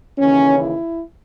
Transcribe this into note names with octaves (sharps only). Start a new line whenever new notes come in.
D#2 C#3 E3 C#4
E4